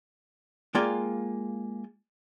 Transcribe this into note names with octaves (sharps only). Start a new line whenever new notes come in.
G#3 A#3 F4 D5 G5 G#5